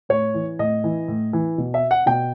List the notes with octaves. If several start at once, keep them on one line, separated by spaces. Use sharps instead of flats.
A2 C#5
E3
A2 D#5
E3
A2
E3
B2
E5
F#5
B2 G5